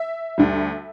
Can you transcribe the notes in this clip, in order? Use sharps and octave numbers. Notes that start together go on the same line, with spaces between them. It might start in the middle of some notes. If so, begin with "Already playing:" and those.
Already playing: E5
D2 D3 G3